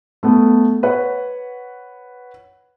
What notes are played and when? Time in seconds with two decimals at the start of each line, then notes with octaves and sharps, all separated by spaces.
0.23 A3 B3
0.83 B4 C#5 F#5